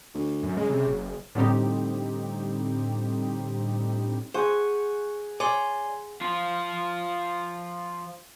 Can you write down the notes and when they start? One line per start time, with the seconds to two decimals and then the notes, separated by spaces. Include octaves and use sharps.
0.14 D2
0.43 F#2
0.57 C#3 G#3
0.70 C3
0.87 F#1
1.35 A2 D3 G3 C4 D#4 G4
4.34 G#4 C5 F#5 C#6 D#6
5.40 C#5 D5 G#5 C6
6.21 F3 F4